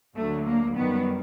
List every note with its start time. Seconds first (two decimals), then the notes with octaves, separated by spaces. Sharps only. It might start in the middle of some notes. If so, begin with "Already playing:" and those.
0.16 D2 D3 F#3 A3
0.47 A#3
0.76 F#2 D#3 G3 B3